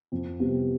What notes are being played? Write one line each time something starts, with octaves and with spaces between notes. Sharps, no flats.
F2
C3 G3 B3